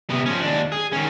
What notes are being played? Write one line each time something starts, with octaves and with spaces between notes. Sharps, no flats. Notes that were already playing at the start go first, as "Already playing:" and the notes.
C3 B3
F3 C#4
D#2 D4
G#4
D#3 C#4